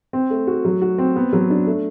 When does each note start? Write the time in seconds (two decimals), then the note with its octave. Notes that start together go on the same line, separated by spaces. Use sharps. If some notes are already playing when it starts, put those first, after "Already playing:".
0.13 C4
0.30 A3
0.47 F#4
0.65 F#3
0.82 F#4
0.98 C4
1.16 B3
1.33 F#3
1.50 D4
1.67 A3